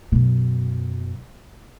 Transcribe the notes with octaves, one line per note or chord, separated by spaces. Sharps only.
F#2 B2